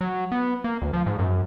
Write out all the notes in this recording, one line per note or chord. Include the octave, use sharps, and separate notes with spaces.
F#3
B3
A#3
D2
F3
G#2
F#2